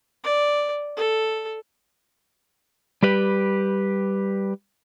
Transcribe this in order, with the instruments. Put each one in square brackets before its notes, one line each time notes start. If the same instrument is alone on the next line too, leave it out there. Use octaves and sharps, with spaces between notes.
[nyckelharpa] D5
A4
[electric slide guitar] G3 G4 B4